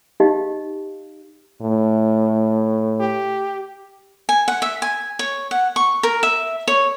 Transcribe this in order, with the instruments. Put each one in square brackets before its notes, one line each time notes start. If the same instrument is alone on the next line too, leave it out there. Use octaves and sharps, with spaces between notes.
[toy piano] D#4 G4 D#5 F5
[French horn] A2
[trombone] G4
[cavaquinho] G#5
F#5
E5
G#5
C#5
F#5
C#6
A#4
E5
C#5